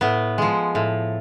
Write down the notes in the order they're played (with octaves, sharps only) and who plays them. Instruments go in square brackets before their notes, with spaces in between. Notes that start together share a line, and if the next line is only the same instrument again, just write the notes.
[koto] A2 B3
F3 G#3
A2